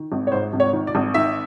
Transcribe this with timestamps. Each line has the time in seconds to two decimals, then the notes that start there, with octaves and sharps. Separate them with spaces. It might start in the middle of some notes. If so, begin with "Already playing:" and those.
Already playing: D#3
0.12 G#1
0.27 C#5
0.32 G#2 C5
0.53 G#1
0.60 C#5
0.73 D#3
0.87 D5
0.95 G#1
1.14 D#3 E5